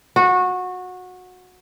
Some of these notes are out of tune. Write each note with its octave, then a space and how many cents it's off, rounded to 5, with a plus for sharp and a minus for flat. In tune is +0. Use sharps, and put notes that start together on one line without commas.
F#4 -20